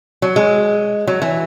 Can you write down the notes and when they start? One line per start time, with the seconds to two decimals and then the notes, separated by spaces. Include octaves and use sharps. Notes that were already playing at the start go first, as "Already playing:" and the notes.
0.22 F#3
0.36 G#3
1.07 F#3
1.22 E3